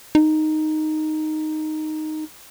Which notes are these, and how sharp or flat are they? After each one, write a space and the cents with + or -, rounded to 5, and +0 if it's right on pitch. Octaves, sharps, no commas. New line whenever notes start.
D#4 -5